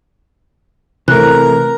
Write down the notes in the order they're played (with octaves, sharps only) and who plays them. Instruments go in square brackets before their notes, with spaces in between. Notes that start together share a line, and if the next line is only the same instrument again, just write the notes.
[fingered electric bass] C3 A3 [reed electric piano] E3 [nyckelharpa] A#4 A#5 [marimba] F#6